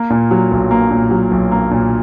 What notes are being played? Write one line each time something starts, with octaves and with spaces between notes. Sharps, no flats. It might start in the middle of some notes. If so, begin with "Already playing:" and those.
Already playing: A#3
A#2
F#3
B1
A#3
A#2
F#3
B1
A#3
A#2